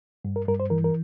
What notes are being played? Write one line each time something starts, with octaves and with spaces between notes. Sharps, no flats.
G2
A#4
G2 A#4
C5
E3 A#4
A#4